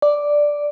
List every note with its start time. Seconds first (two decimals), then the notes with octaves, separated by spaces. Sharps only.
0.02 D5